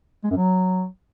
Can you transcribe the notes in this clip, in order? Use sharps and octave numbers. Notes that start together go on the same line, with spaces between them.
G#3
F#2
F#3